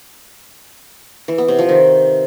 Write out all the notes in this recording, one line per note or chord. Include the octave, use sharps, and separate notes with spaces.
E3
B3
C3
F3
D#3